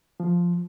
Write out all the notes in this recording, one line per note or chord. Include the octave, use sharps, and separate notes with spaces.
F3